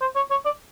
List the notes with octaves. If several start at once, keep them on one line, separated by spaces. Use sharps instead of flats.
C5
C#5
C#5
D5